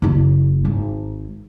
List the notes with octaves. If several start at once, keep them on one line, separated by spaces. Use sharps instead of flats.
F#1 E4
G#1